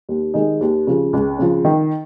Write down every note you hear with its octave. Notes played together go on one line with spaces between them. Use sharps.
D#2
D#3 G#3 D#4 G#4
D#2
C#3 F3
C#2
C#3 F3
D#3